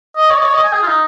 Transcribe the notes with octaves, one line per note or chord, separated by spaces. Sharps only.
D#5
C#5
D#5
C#5
D#5
G#5
G#4
F4
D#4